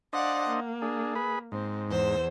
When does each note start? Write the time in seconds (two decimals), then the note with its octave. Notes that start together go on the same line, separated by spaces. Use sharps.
0.13 D4 C5 D5 D#5 F5 F#5
0.50 A#3
0.82 D4 G#4
1.15 G#4 B4 B5
1.52 G#2 C4
1.90 E2 C5 E6